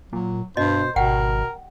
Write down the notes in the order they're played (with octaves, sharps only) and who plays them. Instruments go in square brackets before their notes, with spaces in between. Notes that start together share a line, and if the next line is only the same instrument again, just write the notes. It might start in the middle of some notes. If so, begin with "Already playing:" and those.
[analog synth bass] A#2 [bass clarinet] F#3
[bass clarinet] G2 [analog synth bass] B2 [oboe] C5 [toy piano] D#5
[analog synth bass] G#1 [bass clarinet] B2 [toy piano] G4 F#5 G5 [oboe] A#4